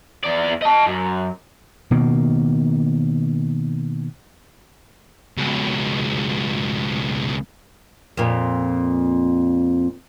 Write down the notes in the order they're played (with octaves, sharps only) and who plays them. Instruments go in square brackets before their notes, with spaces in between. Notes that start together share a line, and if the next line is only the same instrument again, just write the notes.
[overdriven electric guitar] E2 D5
D#5 A5
F#2
[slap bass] B2 D#3 A#3
[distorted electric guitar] C#2 B2
[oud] F2 A#2